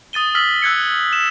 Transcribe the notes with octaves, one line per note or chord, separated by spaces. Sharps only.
D#6 A6 D#7 G7
E6 F6 B6 F#7
E6 F#6 G#6 C#7
E7